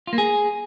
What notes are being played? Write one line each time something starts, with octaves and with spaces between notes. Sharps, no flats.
F4
A#3
G#4